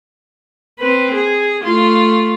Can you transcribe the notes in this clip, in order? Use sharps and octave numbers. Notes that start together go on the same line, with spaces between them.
C4 B4
G#4
A3 F4